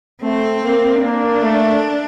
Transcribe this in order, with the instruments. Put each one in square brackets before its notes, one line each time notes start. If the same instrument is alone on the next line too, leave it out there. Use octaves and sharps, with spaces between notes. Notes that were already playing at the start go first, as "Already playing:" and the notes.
[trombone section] A3 [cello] C4
[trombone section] A#3
[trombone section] A#3 [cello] D4
[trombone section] A3